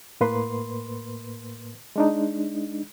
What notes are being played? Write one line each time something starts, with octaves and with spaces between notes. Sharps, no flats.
A2 A#3 B4 C6
G#3 D4 D#4